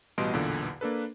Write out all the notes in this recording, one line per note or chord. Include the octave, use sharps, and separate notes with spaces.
A1 B2 G3 D#5 C6 D7
B1 E2 A#2 D3
A#3 D4 A4 B4